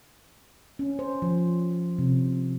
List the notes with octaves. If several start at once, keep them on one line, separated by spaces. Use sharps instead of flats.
C#4
C5
F3
C3